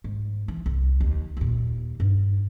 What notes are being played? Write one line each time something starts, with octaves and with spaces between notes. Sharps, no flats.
G#2
E3
C2
D#2
D#2 A#2
G2 D#4